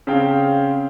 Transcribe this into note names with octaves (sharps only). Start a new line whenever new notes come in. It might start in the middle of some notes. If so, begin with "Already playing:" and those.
C#3 C4 F5 G5